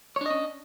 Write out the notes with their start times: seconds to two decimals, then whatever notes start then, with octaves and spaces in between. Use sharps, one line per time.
0.16 C#5
0.21 D4
0.26 D#5
0.31 C#4